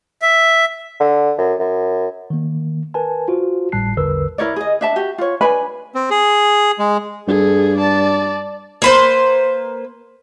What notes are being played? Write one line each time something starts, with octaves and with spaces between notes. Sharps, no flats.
E5
D3
F#2
F#2
D#3 A#3
A#4 B4 G#5 A5
F4 F#4 C5
G#1 A2 G3 A5 F#6 C7
A#1 E2 D3 A#4 B4 E6
E4 A#4 C#5 D5
G#4 D#5
D4 E5 A5
F#4 G4
F4 C#5
D4 B4 G#5 B5
C4
G#4
G#3
G2 G#4 A4
D5 A5
A#3 B4 C5